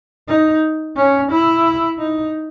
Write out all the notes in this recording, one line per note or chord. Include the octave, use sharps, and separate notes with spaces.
D#4
C#4
E4
D#4